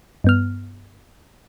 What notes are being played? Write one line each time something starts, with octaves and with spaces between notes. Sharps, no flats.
G2 B3 F6